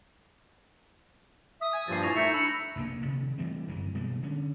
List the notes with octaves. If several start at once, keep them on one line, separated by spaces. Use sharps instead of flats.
E5 D#6
G#5 G#6
G2 A#2 F3 G4 A6 C7
E4 C#6 A#6 F7
A3 D#4 E5 C#7
D4 B5 E6
F1 A#1 B2 A#3
C3 D#3
E3 G3 A3 C4
G1 F#2 E3 G#3
B2 G3 G#3 A#3
D3 C#4